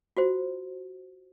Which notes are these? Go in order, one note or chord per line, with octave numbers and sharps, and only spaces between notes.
F4 F#4 C5